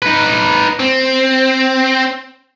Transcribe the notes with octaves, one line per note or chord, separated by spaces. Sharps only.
D#4 B4
C4